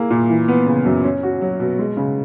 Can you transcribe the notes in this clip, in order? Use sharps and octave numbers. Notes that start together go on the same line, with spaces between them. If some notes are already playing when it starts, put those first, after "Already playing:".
Already playing: A#3 E4 G#4
A#2
E3
B3
C#3
F#2
C#4
F#4
F#3
B2
G#3
C#3